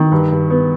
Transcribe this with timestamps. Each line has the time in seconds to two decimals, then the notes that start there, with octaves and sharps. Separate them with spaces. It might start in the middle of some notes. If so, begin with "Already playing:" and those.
Already playing: D#3
0.11 G2
0.31 G2
0.50 B3